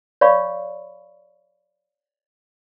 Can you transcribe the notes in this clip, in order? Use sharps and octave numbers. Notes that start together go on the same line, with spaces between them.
C#5 D5 F5 B5 C#6